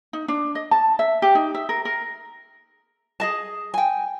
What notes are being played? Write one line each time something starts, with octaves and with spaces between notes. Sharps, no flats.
D#4
D4
D#5
A5
E5
G4
D#4
E5
A#4
A#4
G#4 D#5 A5
G5 G#5